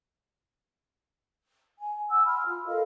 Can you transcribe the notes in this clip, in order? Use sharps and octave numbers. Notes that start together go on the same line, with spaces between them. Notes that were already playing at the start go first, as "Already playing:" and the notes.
G#5
F#5 E6
B5 C6 F6
F4
A4 A#4 D#5 F5